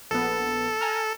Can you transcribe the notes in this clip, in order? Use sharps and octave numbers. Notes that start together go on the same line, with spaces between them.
A#1 B3 A4
G#5 A#5 F6